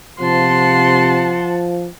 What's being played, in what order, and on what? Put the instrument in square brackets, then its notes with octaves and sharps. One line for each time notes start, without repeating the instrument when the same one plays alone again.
[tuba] C3 [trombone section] F3 [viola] F#5 A5 [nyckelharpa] C6